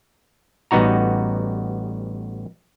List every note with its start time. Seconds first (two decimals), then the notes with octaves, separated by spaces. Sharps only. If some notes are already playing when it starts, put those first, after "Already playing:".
0.71 A1 G3 B3 D#4 F#4 A#5